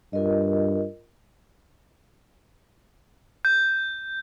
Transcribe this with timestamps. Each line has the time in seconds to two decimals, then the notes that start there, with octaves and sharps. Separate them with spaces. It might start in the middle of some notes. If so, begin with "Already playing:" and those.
0.13 G2 F4 A#4 D#5
3.45 G6